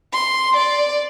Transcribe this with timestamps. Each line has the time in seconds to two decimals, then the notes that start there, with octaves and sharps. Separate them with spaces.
0.14 C6
0.56 D5